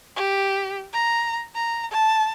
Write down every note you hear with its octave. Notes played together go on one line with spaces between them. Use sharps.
G4
A#5
A#5
A5